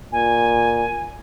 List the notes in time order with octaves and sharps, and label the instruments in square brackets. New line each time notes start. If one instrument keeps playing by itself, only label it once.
[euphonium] A#2 [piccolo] G#5